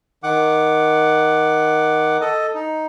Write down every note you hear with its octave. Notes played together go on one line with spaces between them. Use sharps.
D#3 F#5 D6
A4 D#5
D#4